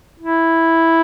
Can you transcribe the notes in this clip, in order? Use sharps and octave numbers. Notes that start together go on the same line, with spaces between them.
E4